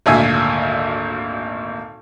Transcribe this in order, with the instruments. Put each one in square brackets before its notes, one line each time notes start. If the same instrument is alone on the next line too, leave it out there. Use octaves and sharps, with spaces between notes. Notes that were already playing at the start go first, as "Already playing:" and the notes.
[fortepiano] G#1 D2 A#2 E5 G#5